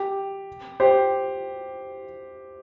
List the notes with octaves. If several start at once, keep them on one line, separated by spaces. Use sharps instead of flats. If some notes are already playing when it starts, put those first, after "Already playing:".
Already playing: G4
G4 C5